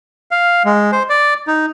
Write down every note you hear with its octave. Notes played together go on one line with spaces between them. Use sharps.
F5
G#3
C5
D5
D#4